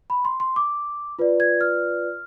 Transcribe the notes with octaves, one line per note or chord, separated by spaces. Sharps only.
B5
C6
C6
D6
F4 B4 D5
G#6
F6